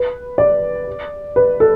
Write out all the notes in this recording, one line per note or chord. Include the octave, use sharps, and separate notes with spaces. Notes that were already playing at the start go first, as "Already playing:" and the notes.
Already playing: B4
D5
B4
A4